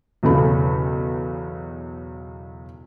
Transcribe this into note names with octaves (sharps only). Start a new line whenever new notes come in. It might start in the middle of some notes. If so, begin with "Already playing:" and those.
B1 E2 C#3 A4 B5